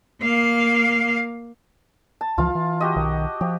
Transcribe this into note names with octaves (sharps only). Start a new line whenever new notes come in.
A#3 F5
A5
C#2 E3 F3 F4 F5
E3
F#4 G4 D#5
B1 D#3
F3 G4